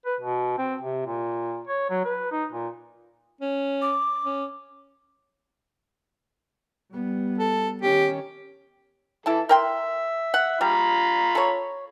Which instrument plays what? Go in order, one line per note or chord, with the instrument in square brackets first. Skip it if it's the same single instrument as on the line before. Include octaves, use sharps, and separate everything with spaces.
[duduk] B4
B2
C4
C3
A#2
C#5
F#3
B4
D#4
A#2
[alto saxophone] C#4
[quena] D6
[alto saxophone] C#4
[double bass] G3 B3
[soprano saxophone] A4
[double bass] D#3 C#4 [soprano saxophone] G4
[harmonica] E3 A4 [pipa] E4 A5
[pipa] A#4 G5 C6 [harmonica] E5
[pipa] F#5
[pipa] G3 [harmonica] F4 A#5 B5
[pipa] A4 C#5